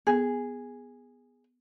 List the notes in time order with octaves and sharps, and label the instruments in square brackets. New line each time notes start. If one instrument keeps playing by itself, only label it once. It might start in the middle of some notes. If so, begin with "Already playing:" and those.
[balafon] B3 G#5 [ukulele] G#4